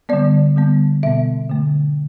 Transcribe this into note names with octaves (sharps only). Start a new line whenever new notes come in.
D3 G3 B3 D5
D3 G3 B3
B2 B3 E5
D3 A3